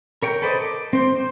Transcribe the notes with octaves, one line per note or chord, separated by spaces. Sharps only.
A#4 C#5 G5
A4 B4 C5 D5 D#5
D6
C4 C5
C4 C5